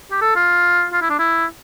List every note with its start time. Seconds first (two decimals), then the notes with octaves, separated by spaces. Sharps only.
0.12 G4
0.21 A4
0.36 F4
0.93 F4
1.02 E4
1.10 D4
1.19 E4